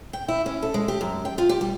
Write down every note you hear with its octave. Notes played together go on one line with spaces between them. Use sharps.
G5
E4
C#4
A4
G#3
G4
F#2
G5
F4
G4
G3